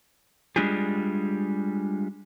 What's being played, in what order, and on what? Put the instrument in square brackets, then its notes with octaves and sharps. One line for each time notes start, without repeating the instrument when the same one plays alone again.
[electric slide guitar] G3 G#3 D4 F4 G4 G#4